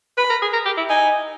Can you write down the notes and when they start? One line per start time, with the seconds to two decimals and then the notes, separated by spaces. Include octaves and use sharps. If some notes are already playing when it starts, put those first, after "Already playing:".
0.18 B4 B5
0.30 A#4
0.42 G#4
0.53 A#4
0.66 G4
0.77 E4
0.90 D#4 G#5